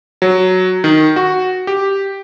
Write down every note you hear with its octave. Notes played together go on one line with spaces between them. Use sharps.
F#3
D#3
F#4
G4